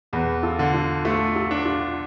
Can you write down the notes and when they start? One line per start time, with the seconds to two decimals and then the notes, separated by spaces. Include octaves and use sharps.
0.13 E2 G#4 B4
0.43 F4 A4
0.59 D3
0.74 F4 A4
1.05 A3 F4
1.36 F4 A4
1.51 D4
1.65 F4